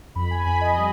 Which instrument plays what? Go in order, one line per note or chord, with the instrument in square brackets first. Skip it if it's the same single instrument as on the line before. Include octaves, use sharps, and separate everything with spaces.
[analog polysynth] F2 B5
G#5
F2 B5
D#5
G3